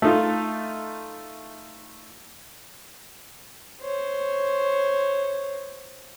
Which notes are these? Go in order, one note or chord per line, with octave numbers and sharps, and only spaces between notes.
A3 D#4 F4
C5 C#5